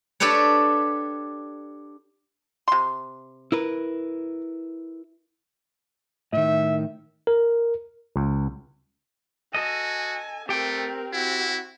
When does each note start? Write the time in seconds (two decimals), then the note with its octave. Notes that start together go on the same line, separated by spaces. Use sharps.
0.20 D4 G4 A4 B4 C#5
2.68 C3 C6
3.52 E4 A#4 B4
6.33 A2 D#3 E5
7.27 A#4
8.16 C#2
9.54 F#4 A4 D#5 G#5
10.49 A3 C4 G4 A#4 G5
11.13 C4 E4 F#4